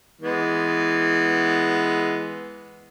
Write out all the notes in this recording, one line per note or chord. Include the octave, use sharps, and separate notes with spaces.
E3 G#3 B3